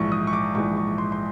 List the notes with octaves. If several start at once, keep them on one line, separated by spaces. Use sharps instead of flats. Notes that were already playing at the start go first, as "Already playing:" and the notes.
Already playing: A#1 G#2 E3 C#6
D#6
C#6
D6
A#1 G#2 E3 C#6
C#6
C6
C6